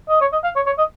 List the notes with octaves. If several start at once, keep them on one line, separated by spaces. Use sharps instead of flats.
D#5
C#5
D#5
F5
C#5
C#5
D#5